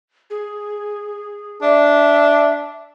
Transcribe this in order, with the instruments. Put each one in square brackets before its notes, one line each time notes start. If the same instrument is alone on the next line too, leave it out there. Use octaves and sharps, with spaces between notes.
[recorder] G#4
[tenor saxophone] D4 [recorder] E5